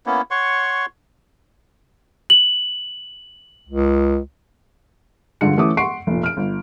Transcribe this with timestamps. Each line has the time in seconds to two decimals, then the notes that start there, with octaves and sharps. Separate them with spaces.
0.06 A#3 B3 C#4 E4
0.31 C#5 F#5 C6 C#6
2.30 F#7
3.68 C#2
5.41 G2 D3 F3 G#3 C#7
5.58 E3 A3 C#4 D6 D#6
5.77 F#5 C6 C#6 C7 D7
6.07 F1 A#2
6.23 F6 D7
6.37 G1